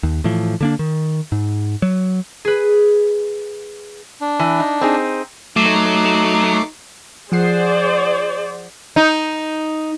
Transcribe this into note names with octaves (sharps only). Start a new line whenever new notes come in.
D#2
A2 E3 F3
D3 A#3 D4
D#3
G#2
F#3
G#4 B4
D4
E3
D#4
C4 D#4 G#4
F#3 A3 D#4 D6 C7
F3 G#4 C5 D5 F#5 C7
D#4